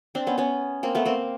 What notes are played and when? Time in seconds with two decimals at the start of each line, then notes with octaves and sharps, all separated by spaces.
0.15 C4 D4
0.27 B3 C#4
0.38 B3 C#4
0.83 A#3 C4
0.95 A3 B3
1.05 A#3 C4